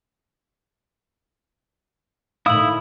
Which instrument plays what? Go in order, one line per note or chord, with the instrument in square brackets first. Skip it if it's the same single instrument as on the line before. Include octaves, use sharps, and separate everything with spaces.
[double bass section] A2 D#3 [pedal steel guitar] E4 D#6 [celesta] F5 E6 F#7